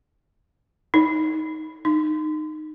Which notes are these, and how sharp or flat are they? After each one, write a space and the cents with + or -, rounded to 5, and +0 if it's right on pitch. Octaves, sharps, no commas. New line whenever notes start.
D#4 +10
D#4 -15